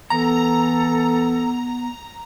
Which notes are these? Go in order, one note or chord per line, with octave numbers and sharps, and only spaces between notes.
E3 B3 A4 A#5